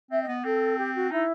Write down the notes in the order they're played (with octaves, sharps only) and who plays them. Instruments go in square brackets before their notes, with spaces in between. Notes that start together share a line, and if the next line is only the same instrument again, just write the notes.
[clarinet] C4 [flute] E5
[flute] D#5
[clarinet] B3
[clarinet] C4 [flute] A4
[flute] G4
F#4
[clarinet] D#4 [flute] E4